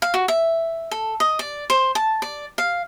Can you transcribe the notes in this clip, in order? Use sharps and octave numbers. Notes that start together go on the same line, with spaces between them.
F5
F#4
E5
A4
D#5
D5
C5
A5
D5
F5